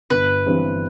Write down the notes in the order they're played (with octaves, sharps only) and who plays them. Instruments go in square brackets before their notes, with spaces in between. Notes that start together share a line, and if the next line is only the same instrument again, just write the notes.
[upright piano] G1 [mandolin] B4
[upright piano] G2 E3 G3 C4